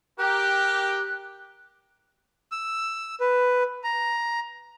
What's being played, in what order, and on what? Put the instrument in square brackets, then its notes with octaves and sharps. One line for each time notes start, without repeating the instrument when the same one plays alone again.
[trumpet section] G4 A#4 [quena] F#6
[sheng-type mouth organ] E6
B4
A#5